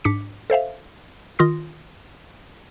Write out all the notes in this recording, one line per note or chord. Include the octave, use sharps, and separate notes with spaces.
G#2 D4 D6 B6 C#7
A4 C5 E5 F5
D#3 F4 C6 D#6 A#6